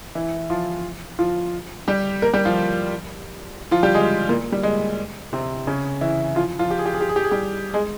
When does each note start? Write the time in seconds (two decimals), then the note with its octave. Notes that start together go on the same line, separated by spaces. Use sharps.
0.15 E3 E4
0.50 F3 F4
1.19 F3 F4
1.88 G3 G4
2.22 A#3 A#4
2.33 G3 G4
2.45 F3 F4
3.71 F3 F4
3.83 G3 G4
3.94 G#3 G#4
4.29 A#2 A#3
4.52 G3
4.63 G#3
5.33 C3 C4
5.67 C#3 C#4
6.01 E3 E4
6.36 F3 F4
6.59 F3 F4
6.71 G4
6.78 G#4
6.86 G4
6.94 G#4
7.01 G4
7.09 G#4
7.16 G4
7.24 G#4
7.31 G3 G4
7.74 G#3 G#4